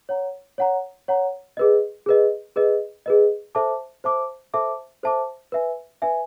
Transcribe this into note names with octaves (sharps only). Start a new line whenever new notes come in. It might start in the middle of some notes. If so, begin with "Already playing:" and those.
C#5 F#5 A#5
C#5 F#5 A#5
C#5 F#5 A#5
G#4 B4 D#5
G#4 B4 D#5
G#4 B4 D#5
G#4 B4 D#5
A4 C5 E5 A5 D6
A4 C5 E5 A5 D6
A4 C5 E5 A5 D6
A4 C5 E5 A5 D6
B4 E5 G#5
B4 E5 G#5